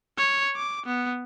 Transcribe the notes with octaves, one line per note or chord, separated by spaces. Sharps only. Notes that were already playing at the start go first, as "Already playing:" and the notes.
C#5
D6
B3